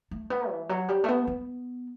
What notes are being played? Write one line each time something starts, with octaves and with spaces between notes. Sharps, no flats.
A3
B3
E3
F#3
G3
A3
B3
B3